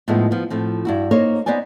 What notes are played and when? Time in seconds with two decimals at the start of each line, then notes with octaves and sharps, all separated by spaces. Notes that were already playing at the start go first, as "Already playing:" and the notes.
0.08 A2 F3 G#3 B3 D#4
0.31 F3 B3
0.50 A2 F3 C4
0.85 G2 E4 F#4
1.11 A#3 D#4 C5 C#5
1.46 B3 D#4 C5 D5 G#5